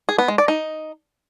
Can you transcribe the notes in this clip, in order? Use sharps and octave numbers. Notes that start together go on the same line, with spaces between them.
G#4
B3
G#3
D5
D#4